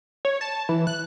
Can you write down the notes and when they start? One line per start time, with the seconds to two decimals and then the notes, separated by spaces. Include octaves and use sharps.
0.25 C#5
0.41 A5
0.69 E3
0.87 F#6